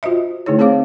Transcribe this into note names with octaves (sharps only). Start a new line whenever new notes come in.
F4 F#4 C5 D#5 E5
D3 A3 D#4 E4 G#4 C#5
C4 G#4 C5 C#5 F5 D6